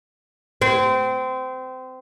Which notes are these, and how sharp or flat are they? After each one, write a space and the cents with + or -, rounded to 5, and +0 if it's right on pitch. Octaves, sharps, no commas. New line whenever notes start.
C4 -25